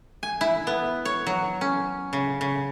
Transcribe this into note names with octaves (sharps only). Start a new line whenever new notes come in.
G#5
E4
B3
C#5
F#3
C#4
C#3
C#3